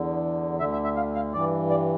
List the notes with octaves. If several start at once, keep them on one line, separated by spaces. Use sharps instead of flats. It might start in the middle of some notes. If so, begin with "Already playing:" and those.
Already playing: E2 D3
D2 D3 E5
E5
E5
F5
F5
G2 E3 D5
D5